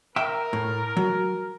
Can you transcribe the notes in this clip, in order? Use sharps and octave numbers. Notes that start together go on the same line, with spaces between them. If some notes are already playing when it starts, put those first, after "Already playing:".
A#4 E5 G5
A2
F#3